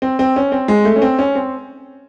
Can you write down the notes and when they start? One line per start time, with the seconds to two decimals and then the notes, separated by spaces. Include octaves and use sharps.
0.02 C4
0.19 C4
0.36 C#4
0.52 C4
0.68 G#3
0.85 A3
0.96 C#4
1.02 C4
1.19 C#4
1.35 C4